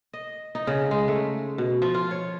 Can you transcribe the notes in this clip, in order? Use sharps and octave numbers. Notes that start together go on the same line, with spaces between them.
D#5
D#4
C#3
G#3
A3
B2
F3
F4
C#5